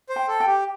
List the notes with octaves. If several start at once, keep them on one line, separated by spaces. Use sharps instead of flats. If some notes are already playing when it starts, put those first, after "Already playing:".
C5
G5
A4
G5
G4